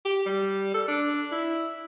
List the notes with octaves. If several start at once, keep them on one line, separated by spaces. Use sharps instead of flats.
G4
G3
A4
D4
E4